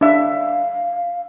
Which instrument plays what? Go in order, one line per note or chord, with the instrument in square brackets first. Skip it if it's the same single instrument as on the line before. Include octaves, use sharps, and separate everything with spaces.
[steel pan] D4 E5 [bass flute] F5